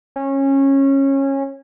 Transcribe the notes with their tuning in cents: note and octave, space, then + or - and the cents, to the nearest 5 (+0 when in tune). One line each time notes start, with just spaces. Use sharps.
C#4 -20